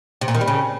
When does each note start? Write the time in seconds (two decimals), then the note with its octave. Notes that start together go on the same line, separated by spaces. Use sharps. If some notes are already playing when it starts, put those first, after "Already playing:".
0.21 C3
0.28 A#2
0.34 D#3
0.41 G3
0.48 C#3